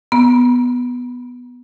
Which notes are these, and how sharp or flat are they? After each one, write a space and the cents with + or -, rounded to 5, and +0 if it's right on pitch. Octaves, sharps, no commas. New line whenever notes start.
B3 +0 A#5 +40